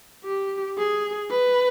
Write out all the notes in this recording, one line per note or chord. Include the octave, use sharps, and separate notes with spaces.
G4
G#4
B4